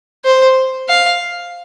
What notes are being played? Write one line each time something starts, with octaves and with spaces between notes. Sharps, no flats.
C5
F5